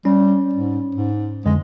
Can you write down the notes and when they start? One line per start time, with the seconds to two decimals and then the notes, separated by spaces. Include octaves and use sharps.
0.05 G3 C#4
0.54 G#2
0.95 G#2
1.46 F2 D3 G#3